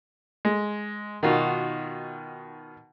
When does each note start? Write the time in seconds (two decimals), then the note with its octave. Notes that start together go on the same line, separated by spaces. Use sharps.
0.45 G#3
1.23 B2 D#3 D#4 F4 F#4